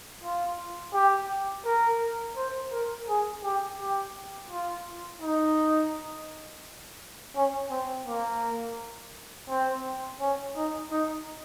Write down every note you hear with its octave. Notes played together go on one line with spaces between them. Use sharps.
F4
G4
A#4
C5
A#4
G#4
G4
G4
F4
D#4
C#4
C4
A#3
C4
C#4
D#4
D#4